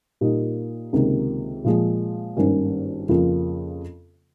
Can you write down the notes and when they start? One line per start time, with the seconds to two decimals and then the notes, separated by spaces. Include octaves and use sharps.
0.21 A#2 G3 A#3 D#4
0.93 C#2 C3 D#3 A#3
1.64 A#2 F3 G#3
2.37 G#1 G2 D#3 A#3 C#4
3.08 F2 C#3 F3 A#3 F4